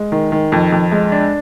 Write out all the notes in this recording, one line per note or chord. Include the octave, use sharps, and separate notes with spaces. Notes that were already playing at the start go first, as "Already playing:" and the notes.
Already playing: G#3
D#3
D#3
F2
F2
G#3
D4